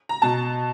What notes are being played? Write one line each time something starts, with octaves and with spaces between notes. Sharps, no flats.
A#5
B2 A5